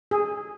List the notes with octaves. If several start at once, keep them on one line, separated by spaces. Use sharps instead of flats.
G#4